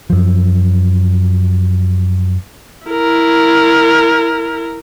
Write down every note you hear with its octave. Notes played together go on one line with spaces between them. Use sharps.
F#2 F3
E4 A#4